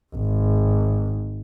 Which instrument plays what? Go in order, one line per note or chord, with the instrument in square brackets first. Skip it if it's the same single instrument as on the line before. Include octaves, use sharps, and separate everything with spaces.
[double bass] G#1